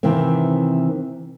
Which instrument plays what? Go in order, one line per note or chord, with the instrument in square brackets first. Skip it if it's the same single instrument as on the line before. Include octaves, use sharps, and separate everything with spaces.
[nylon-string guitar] C3 D#3 E3 A#3 C4